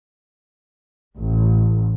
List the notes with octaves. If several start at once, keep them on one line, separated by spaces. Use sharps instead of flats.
A1